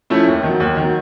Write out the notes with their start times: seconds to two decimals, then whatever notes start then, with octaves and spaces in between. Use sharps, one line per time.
0.10 F3 A3 C#4 E4
0.27 D#2
0.43 D#3 F#3
0.60 D#2
0.77 D#3 F#3